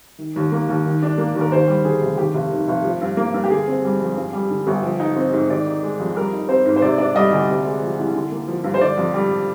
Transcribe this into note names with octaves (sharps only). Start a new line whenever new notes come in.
D#3
D#2
A#3
D#2
D#3
D4
A#3
D#2
A#4
D#2 C5
G3
D3 G#4
F1
D#2 G4
F1
D#3
F1
F3
G2
A#3
G2
G4
D3 G#4
C4
G3
F2
G2
G3
D3
G1
F3
D#4
C4
G#2
D#3 D5
D#4
G#3
F2
G3 A#4
D#4
C4 C5
G#2
C5
C3 D5
D4 D5
G3 D#5
D2 D5
C3
G#3
F3
C2
D3
A#3
F3
G2
C5
D3 D5
F2
G3